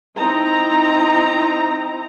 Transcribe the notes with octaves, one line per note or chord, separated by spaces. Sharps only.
C4 D#4 E4 A#5